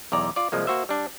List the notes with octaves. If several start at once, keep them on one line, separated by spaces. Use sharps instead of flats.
B1 E2 D5 A#5
F4 D5
C2 F3 G#3 A#3
A#3 F#4 C5 E5
G3 D4